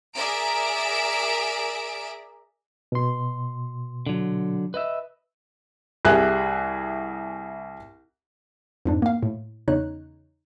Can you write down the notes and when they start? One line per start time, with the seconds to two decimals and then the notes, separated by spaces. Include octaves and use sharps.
0.15 G#4 A#4 D5 E5 A#5 D7
2.92 B2 C6
4.07 D3 F#3
4.74 B4 D#5 E5
6.05 C2 G4 G#4 E5 F#6
8.86 F2 G#2 D4
9.02 A#3 F5
9.23 A2
9.68 E2 C#3 D#4 C#5 F#6